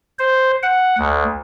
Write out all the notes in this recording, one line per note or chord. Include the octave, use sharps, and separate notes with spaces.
C5
F#5
D2